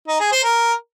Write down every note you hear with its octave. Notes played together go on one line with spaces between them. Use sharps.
D#4
G#4
C5
A#4